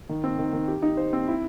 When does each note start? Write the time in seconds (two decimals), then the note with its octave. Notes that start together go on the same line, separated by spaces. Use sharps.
0.09 D#3
0.24 C4
0.39 D#3
0.53 D#3
0.68 G4
0.82 D#4
0.97 C5
1.13 C4
1.28 E4